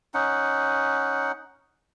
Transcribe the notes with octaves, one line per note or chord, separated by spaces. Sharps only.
C#4 D#4 F#5